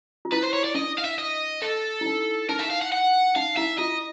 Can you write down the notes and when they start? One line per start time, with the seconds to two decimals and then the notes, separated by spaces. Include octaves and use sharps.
0.25 F4
0.32 E4 B4
0.43 C5
0.53 C#5
0.64 D5
0.74 D4 D#5
0.98 F5
1.04 E5
1.18 D#5
1.62 A4
2.01 E4
2.06 D#4
2.49 D#4 A#4
2.59 E5
2.70 F5
2.82 F#5
2.92 F#5
3.36 D#4 F5
3.57 E4 E5
3.78 F4 D#5